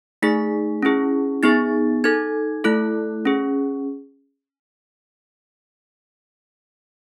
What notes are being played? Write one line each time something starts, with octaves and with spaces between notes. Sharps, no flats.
A3 D#4 G#4 B6
C#4 E4 G#4
B3 D#4 G#4 A6
D#4 A4 G#6
A3 E4 A4 F#6
C#4 G#4